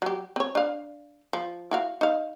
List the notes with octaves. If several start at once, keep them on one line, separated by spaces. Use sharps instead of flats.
F#3 G4
C4 C#5
D4 F5
F3
E4 F#4 F5
D#4 F5